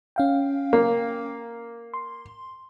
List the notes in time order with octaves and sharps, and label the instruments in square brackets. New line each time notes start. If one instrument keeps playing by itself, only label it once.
[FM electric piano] C#4 F5 G5
[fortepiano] A#3
[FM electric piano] C6